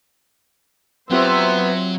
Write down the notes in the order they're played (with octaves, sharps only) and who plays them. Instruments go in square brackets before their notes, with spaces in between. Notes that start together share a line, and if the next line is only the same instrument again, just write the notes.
[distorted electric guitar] F#3 [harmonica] B3 [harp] C4 F4 G4 [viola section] C5 E5